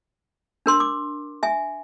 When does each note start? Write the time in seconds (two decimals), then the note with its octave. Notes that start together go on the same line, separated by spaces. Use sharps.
0.66 D4 A#4 C6
0.80 D6
1.43 E5 G#5